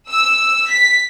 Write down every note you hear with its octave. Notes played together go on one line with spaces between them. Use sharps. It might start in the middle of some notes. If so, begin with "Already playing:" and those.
E6
B6